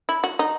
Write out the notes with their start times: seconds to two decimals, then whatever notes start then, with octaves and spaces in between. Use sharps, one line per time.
0.09 E4
0.24 F#4
0.39 D#4